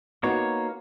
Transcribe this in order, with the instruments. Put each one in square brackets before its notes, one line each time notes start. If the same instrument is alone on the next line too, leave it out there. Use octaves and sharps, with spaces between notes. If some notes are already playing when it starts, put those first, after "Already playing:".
[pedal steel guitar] A#3 C#5 [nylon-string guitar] B3 D#4 F#4